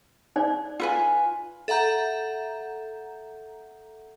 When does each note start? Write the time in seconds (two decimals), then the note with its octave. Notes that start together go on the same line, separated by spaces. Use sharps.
0.36 D#4 C5 D5
0.80 F4 B4 G#5
1.68 A4 E5 F#5 A#5 G6